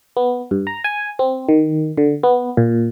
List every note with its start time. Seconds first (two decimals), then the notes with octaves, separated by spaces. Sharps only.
0.17 B3
0.51 G2
0.67 A#5
0.84 G#5
1.19 C4
1.49 D#3
1.98 D3
2.23 B3
2.57 A#2